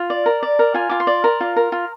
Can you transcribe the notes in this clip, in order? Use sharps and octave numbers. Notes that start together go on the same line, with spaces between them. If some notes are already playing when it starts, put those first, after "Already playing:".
Already playing: F4
D5
A#4
D5
A#4
F4 G#5
F4 D6
C6
D5
A#4
F4
A#4
F4